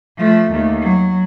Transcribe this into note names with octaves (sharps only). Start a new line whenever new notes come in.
F3 A3
D#2 A3
F#3